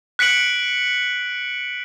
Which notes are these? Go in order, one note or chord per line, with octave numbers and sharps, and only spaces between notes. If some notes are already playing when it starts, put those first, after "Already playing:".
F#6 B6 C#7 D7 F#7